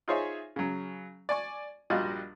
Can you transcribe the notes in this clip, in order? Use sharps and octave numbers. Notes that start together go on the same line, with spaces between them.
D#4 F4 G#4 C5 C#5 E5
C#3 F#3
D5 G#5 C#6
A#1 G3 F4 F#4 D#5